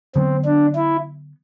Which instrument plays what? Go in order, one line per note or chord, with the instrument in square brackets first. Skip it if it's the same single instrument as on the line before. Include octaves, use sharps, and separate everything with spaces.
[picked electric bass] D3 F#3 B3 [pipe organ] C4
[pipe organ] D4
E4